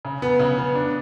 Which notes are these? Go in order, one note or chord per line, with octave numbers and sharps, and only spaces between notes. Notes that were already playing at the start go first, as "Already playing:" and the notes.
C#3
B3
C#3
B3
D4